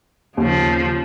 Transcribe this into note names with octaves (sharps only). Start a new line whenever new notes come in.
D#2 C#3 F3